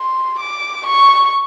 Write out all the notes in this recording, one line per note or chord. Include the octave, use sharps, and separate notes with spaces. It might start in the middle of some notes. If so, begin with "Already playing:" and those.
Already playing: C6
D6
C#6